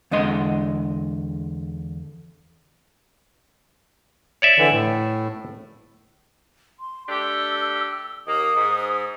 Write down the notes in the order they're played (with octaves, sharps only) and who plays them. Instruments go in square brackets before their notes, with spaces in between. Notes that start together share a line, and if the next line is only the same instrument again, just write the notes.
[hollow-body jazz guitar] E2 D3 G#3 D#5 C6
[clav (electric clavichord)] C#5 D5 E5
[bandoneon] D3 E3
A2
[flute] C6
[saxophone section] A3 D4 G4 [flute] E6
[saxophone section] D#2 D#3 A#3 [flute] D#6
[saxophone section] G#2